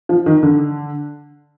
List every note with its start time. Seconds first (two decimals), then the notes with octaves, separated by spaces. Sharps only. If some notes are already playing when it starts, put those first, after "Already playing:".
0.09 F3
0.26 D#3
0.43 D3